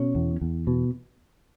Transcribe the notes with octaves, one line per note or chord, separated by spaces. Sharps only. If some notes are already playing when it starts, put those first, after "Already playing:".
Already playing: B2 C#4
E2
E2
B2